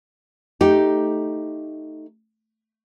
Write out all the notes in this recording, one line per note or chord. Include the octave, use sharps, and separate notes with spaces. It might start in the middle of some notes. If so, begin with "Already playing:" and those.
A3 D#4 G4